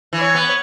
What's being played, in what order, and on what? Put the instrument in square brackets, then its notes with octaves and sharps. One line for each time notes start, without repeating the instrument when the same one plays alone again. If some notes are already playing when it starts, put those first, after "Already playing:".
[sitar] E3
[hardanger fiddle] C#5
[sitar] B3